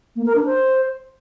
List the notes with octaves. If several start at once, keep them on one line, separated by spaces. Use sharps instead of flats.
A#3
A#4
D4
C5